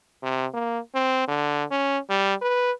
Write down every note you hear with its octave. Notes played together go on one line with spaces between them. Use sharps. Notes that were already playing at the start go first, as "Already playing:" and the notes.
C3
A#3
C4
D3
C#4
G3
B4